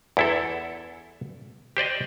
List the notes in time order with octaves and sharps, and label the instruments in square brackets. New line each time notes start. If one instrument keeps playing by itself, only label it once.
[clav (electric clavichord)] E2 E4 A4
G4 C5 D5 D#5